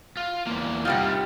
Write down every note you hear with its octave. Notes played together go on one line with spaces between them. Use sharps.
F4
E2 A#3
C3 G3 D#4 F4 F#5